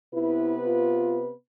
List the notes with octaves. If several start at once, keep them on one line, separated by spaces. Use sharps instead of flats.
C3 B3 E4 B4
F4